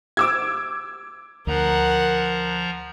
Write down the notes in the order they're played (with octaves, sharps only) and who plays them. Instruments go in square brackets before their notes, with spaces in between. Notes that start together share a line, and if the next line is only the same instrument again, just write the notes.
[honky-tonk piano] D6 E6 G#6
[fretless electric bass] D2 [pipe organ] F3 A#5 [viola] A#4 F#5